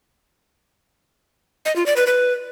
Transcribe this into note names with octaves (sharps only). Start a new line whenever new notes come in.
D#5
F4
D5
B4
B4